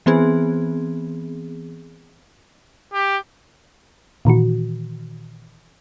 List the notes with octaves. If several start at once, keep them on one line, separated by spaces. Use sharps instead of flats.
E3 B3 C4 G#4
G4
A#2 D#3 E3 F#4